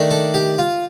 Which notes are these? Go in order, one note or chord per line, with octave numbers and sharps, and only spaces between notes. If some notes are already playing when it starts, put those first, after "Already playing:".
Already playing: D#3 A3 D4
A4
G4
F4